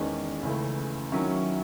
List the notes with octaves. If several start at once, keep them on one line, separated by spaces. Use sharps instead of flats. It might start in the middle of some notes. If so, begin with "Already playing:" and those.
Already playing: E2 D#3 G#3 C#4
C#2 C#3 E3 A3
D#3 F#3 C#4 E4